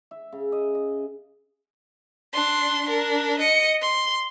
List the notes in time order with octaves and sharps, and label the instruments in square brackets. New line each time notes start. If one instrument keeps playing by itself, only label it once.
[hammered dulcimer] E5
C#3
D#5
D#5
[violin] D4 C6
D4 A#4
D#5 C#7
C6